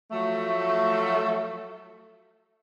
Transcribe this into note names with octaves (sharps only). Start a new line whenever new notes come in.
F3 F#3 A3